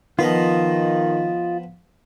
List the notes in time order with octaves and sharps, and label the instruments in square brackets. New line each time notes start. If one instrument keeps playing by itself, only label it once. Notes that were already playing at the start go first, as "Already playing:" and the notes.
[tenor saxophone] D#3 [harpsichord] F3 B3 [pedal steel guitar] F4 D#5